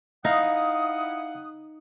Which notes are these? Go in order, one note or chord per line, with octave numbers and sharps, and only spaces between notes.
D#4 E4 F5 F#5 D#6